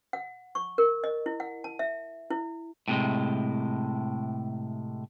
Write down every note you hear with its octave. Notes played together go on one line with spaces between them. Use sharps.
F#5
C#6
A#4
D#5
E4
F#5
A5
E5
E4
A2 C3 G#3